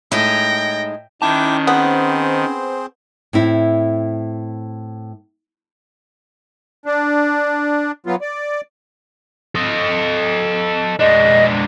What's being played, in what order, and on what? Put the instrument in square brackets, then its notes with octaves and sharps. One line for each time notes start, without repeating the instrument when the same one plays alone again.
[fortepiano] A2 [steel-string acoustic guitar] G#3 D#4 [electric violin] G5 A#6
[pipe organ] D#3 [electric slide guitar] C#4 A5 [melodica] E4 G5 D6
[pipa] B3 [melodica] C4 G#4 C5
[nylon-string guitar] A2 C4 E4
[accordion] D4
F#3 B3 F4
D5
[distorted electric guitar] A4 D#5
[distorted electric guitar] G#3 D4 [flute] D#5